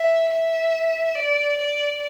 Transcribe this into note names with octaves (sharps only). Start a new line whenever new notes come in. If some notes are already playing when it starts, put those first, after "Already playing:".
Already playing: E5
E5
D5
D5